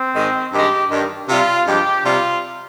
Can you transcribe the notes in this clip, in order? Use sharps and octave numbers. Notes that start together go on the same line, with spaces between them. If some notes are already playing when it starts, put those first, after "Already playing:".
Already playing: C4
G#2 D#3 G#3
G2 D#3 G#3 G4
G2 D#3 G3
C3 G3 F4
G2 F3 G#3 G4
C3 G3 F4